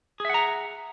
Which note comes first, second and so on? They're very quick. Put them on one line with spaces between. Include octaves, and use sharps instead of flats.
G#4 E5 F#5 A#5